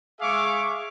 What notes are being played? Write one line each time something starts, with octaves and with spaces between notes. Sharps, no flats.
G#3 G#4 E5 F5 C#6 D6